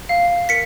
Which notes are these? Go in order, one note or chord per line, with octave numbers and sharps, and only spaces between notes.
F5
A#4 B6 C#7